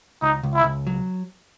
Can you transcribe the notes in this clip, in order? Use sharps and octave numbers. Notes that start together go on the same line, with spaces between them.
C#2 D#4
C#2
E4
C#2
F#3